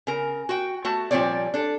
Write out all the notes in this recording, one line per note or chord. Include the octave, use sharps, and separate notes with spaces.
C#3 A#4
F#4 G5
A3 F#4 A5
A#2 F3 G3 C4 C#5 D5
D4 A4